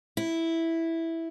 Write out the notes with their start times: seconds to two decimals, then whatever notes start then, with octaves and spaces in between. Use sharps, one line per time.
0.17 E4